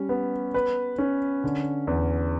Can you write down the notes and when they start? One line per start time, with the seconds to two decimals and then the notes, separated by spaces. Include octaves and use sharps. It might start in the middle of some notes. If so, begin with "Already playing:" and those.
Already playing: G3 C#4
0.09 B3
0.54 B4
0.99 C#4
1.44 D3
1.87 E2